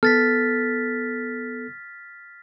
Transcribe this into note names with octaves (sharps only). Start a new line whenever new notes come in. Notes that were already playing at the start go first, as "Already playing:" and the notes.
B3 A4 F6 A6 B6